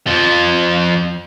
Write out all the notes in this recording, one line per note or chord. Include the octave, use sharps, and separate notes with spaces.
F2 F3